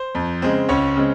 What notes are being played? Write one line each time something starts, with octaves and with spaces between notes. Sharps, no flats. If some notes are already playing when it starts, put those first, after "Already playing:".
Already playing: C5
F2
C#3 G#3 C4
C#2 C#4 C#5
C#3 G#3 C4